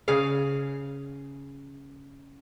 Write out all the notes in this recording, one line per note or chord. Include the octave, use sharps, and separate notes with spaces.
C#3 G#4 F5